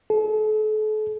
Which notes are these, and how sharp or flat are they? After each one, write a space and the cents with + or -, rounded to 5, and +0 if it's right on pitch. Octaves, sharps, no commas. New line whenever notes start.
A4 -40